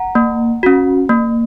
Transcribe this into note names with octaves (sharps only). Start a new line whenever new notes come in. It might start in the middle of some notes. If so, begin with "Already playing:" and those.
Already playing: F#5 A#5
A#3
C#4 F#4
A#3